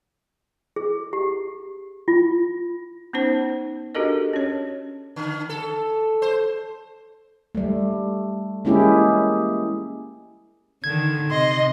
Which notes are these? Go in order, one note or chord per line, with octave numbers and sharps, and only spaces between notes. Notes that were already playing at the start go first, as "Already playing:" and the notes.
G#4
G4
F4
B3 C#4 D#4 C5
D4 F#4 G4 A4 A#4 D#5
C#4 C#5
D3
A4
C5
G3 A3
G#3 A#3 C#4 E4 G4 G#4
D3 D#3 G#6
C3 D#5 C6